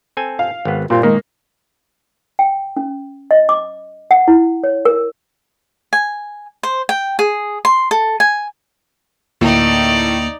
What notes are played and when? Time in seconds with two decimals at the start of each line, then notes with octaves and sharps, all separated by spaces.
0.17 C4 A4 G#5
0.39 F5
0.65 G#1 B3
0.90 A#2 G3 C4 F4
1.03 D#3 G#3 A#3
2.39 G5
2.77 C#4
3.31 D#5
3.49 D6
4.11 F#5
4.28 E4
4.64 C#5
4.85 A#4
5.93 G#5
6.63 C5
6.89 G5
7.19 G#4
7.65 C6
7.91 A4
8.20 G#5
9.41 D2 A2 A#3 D#4 D5